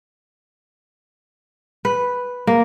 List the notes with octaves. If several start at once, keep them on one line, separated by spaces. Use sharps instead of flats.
B4
A#3